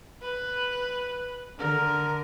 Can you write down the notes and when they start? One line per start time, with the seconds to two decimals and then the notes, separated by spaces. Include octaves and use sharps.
0.22 B4
1.58 D3 A#4